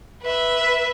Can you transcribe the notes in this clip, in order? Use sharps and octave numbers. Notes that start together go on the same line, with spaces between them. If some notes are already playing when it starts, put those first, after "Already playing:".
B4 E5